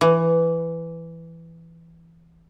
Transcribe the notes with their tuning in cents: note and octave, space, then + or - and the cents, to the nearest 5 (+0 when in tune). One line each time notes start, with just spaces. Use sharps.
E3 +10